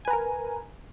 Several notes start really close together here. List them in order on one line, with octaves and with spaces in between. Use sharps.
G#5 B4 A#5 A#4